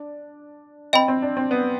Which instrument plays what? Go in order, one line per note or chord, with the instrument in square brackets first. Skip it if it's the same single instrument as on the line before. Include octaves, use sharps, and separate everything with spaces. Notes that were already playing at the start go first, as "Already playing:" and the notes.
Already playing: [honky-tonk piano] D4
[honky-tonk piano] C4 [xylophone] D#5 G5 B5
[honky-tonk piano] C4
D4
C4
B3